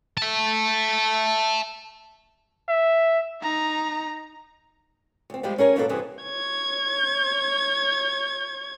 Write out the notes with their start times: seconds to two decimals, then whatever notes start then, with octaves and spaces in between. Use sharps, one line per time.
0.17 E5 A5
2.69 E5
3.43 D#4 A#5
5.30 D2 C4
5.43 F3 G3 G#3 F4 G4
5.58 C#4 G#4 A#4 C#5
5.76 F2 G#2 B2 A#3 F#4 A4
5.89 G2 C3 E3 C4 D4 G#4
6.23 C#5 G#6